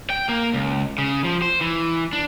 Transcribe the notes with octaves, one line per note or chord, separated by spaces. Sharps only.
G5
A#3
C#2
C#3
F3
C5
E3
D4